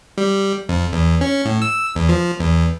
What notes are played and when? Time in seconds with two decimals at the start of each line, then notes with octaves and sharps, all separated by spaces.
0.18 G3
0.69 F2
0.93 E2
1.21 C#4
1.45 A2
1.62 E6
1.95 E2
2.09 F3
2.40 E2